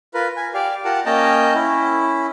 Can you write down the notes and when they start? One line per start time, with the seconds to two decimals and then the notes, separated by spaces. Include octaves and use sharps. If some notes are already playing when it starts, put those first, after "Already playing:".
0.14 F4 A#4 B4
0.37 G#5
0.54 G4 D5 F5
0.85 F4 G4 A#4 F#5 A5
1.06 A#3 C#4 D#5 G5 A5 A#5
1.54 C#4 E4